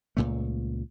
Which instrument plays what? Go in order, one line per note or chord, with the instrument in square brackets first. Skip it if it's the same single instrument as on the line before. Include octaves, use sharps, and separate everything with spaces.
[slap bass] C#2 F#2 A#2 A3